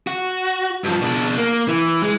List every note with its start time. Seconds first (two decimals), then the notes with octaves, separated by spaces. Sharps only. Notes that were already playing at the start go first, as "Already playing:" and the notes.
0.07 F#4
0.84 G2 F3
1.01 B2 D4
1.37 A#3
1.68 E3
2.03 G#3